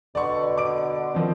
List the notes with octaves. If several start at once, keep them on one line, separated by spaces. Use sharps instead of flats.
B2 D3 D5 C#6
D6 D7
D#3 F3 C4